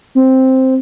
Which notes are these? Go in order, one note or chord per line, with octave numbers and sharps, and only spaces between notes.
C4